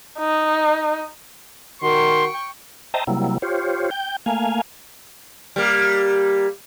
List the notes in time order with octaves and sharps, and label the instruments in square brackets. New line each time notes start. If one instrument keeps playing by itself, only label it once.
[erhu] D#4
[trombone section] D#3 F#4 A#4 [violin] G5 C#6 [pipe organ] C6
[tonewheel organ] C5 D#5 E5 G5 A5 A#5
C3 F#3 G3 A#3 E4
F4 G4 C5 C#5
G5 G6
A3 A#3 F5 G#5
[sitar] G3 A#3